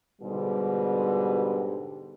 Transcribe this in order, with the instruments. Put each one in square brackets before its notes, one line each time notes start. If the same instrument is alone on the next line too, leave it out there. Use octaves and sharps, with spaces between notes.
[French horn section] G#2 B2 D3 G3